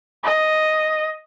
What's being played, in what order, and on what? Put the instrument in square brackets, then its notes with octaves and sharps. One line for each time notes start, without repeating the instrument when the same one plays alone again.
[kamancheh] D#5